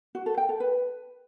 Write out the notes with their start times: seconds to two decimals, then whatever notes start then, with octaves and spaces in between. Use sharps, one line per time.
0.15 F#4
0.26 A4
0.37 G5
0.49 A4
0.60 B4